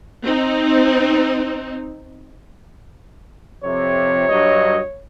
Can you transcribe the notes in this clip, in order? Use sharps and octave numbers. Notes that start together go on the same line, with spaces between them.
C4 D#4
F2 C3 C#5
G2 F#3 D#5